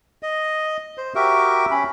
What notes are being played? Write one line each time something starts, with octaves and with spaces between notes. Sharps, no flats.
D#5
C5
F#4 G4 A#4 E5
C#4 B5